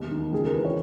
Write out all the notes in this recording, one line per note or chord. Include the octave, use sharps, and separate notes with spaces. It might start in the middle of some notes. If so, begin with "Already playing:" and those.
Already playing: E1 D#2 D#5
D#3
C#2 G#4
A#4
E3 B4
C#5